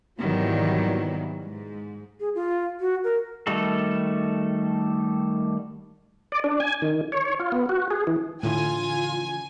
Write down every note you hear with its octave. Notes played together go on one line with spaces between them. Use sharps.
G#1 B2 D#3 E3 F#3 G3
G#2
G#4
F4
F#4
A#4
D#3 G3 A3 F#4 A4
D5
D4
G#5
D#3
C#5
F4
B3
F#4
G#4
E3
A2 C#3 E3 F3 F4 G#5